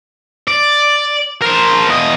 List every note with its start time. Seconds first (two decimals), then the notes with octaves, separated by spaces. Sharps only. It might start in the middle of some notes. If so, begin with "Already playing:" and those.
0.48 D5
1.42 A#4 C5
1.88 E2 D#5